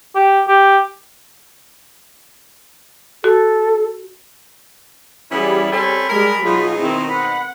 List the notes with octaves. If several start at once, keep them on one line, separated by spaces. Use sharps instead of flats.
G4
G4
F#4 A4
E3 G3 B3 C#4 E4 G#4
C4 C#4 A4 B5
G3 G#3 G#4 A#4
B2 F#3 D#4 F4 G#4
D#3 C4 E4
F#5 B5